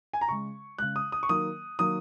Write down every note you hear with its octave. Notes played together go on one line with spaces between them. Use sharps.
G#5
A#5
C#3 G#3 C#6
C#3 G#3 F#6
D#6
D#6
C#6
D#3 F#3 A#3 D#6
D#3 F#3 A#3 D#6